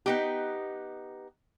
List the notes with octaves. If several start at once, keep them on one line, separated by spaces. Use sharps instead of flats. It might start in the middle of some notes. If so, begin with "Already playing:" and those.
B3 D#4 G4